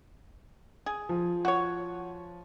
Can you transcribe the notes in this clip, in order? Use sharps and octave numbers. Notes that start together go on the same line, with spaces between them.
G#4
F3
F#4 C#5